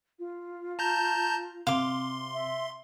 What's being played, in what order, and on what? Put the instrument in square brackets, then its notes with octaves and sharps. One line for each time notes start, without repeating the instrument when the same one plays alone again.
[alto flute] F4
[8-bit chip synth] A5 A#5 G6
[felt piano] C3 [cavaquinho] F5 D6 [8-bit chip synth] C6
[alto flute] E5